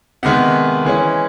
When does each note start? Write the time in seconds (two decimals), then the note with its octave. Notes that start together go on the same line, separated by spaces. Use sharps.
0.23 C3 D#3 G#3 B3 F#5
0.85 E3 G#3 C#4